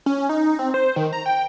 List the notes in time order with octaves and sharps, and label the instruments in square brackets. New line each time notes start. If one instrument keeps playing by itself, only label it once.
[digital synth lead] C#4
D#4
C4
C5
D#3
A#5
G5